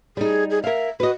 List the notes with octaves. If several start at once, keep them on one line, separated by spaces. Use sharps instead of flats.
G3 D#4 G#4
G#4
A#4 E5 F5
F#4 B4 D#5